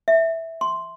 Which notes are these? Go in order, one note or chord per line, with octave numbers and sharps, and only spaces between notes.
E5
C6